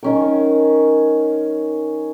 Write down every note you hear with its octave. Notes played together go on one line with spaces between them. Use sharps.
D#3 C#4 A#4